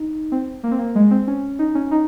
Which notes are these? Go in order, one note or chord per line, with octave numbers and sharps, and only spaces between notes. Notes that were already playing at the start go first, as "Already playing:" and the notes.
Already playing: D#4
C4
A#3
C4
A#3
G#3
C4
C#4
D#4
C#4
D#4